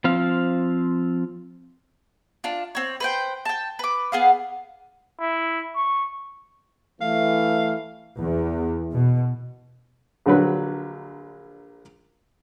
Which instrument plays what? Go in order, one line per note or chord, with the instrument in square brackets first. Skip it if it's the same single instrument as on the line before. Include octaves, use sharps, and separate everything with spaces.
[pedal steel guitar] F3 C4 F5
[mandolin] D4 F4
C4 C#5
B4 C5 G5
G5 A5
B4 D6
B3 G#4 F5
[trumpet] E4
C#6
[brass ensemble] E3 A3 [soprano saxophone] F5
[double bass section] E2
B2
[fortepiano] A#1 D3 F#3 B4